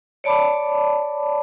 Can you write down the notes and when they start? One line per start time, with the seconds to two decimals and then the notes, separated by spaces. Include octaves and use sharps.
0.24 C#5 D5 A5 B5 D6